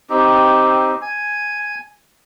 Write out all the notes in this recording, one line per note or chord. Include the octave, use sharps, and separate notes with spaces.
C4 D#4 G4
G#5